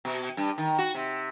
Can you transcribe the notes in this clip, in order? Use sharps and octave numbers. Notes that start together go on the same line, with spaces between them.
B2
G2
D#3
F#4
C3